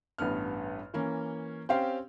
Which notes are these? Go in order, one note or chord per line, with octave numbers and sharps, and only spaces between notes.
A1 G2 B3 F6
E3 A#3 C#4
C4 C#4 G4 F5 G5 C6